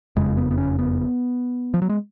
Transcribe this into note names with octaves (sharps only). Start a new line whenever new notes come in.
F#1 F2 C#3 G#3
B3
B3
C#4
B3
F3
F#3
G#3